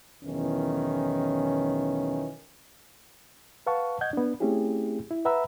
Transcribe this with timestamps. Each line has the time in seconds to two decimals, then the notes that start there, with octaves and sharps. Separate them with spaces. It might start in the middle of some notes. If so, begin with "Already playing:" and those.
0.23 B1 E2 D#3 E3 C#4
3.67 B4 F5 F#5 A5 C#6
4.01 D#5 F#5 G6 G#6
4.13 B3 D4
4.40 A3 C4 C#4 E4 G4 G#4
5.11 E4
5.25 B4 E5 F#5 A#5 B5 E6